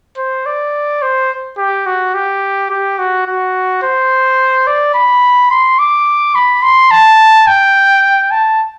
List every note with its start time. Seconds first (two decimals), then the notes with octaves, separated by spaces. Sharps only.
0.17 C5
0.46 D5
1.02 C5
1.58 G4
1.86 F#4
2.14 G4
2.70 G4
2.99 F#4
3.26 F#4
3.83 C5
4.67 D5
4.94 B5
5.51 C6
5.79 D6
6.35 B5
6.63 C6
6.91 A5
7.47 G5
8.31 A5